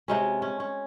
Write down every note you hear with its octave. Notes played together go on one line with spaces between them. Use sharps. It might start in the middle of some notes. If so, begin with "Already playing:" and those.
C3 G#3 C#4
C#4
C#4